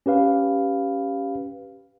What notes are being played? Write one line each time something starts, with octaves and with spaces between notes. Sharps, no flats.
C#4 G4 B4 F5